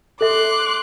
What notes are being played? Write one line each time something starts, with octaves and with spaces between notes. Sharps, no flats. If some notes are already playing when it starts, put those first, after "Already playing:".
A4 E5 C6 D6 F#6